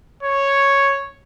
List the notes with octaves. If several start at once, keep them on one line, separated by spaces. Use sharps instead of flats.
C#5